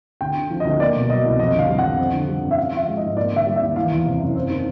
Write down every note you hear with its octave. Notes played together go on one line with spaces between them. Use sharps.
D2 G5
D3
F3
D2 D#5
A#3 D5
B2
F#3 D#5
C2
F2 D#5
D3 F5
G3
F#5
F2
C4
D3
G3
G2
E5
C#4 F5
F3 E5
G#3
G#2 D#5
A#3 D5
D3 E5
G3
E5
D#2
E3 F5
E2
C3
F#1
C4
D#3